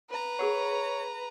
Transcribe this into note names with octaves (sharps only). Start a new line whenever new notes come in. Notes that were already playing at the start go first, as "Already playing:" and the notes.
B4 A#5
G#4 A#4 C#5 F#5